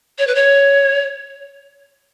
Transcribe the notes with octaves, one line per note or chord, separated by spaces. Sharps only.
C#5
B4
C#5